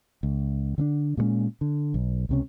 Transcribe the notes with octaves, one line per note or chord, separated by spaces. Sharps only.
C#2
D3 C4 D4
A#2 G3 G#3 C#4
D3
B1
C#2 C3 C#4